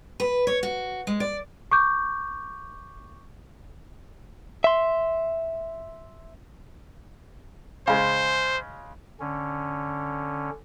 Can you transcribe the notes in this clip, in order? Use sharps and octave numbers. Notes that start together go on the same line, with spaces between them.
B4
C#5
F#4
G#3
D5
C#6 D6 G6
E5 C6
C#3 G#3 C5
D3 C#4